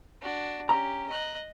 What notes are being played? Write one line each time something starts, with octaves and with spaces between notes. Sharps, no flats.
D4 F#4
C#4 G4 A#5
D#5 F#6